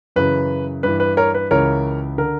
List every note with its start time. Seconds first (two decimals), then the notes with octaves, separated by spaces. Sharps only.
0.16 F#2 C#3 E3 B4
0.83 G2 E3 B4
1.00 B4
1.17 A#4 C#5
1.34 B4
1.51 C#2 C#3 E3 A#4 C#5
2.18 D3 A#4